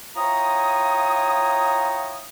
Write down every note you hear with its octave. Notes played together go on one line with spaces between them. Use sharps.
E4 F4 C#5 G5 A#5 D#6